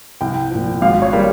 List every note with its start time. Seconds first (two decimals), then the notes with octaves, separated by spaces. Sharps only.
0.21 C2 G5
0.51 A#2 F3
0.82 G#1 F5
1.02 C#5
1.12 G3 A#3